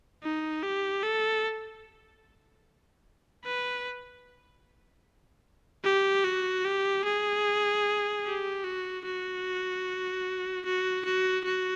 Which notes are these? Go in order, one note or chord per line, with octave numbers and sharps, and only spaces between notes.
D#4
G4
A4
B4
G4
F#4
G4
G#4
G4
F#4
F#4
F#4
F#4
F#4